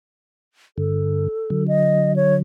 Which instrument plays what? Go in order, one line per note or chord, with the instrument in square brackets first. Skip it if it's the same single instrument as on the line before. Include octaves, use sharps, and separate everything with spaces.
[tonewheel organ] G2 D3 [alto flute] A4
[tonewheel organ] D3 F#3
[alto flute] D#5
C#5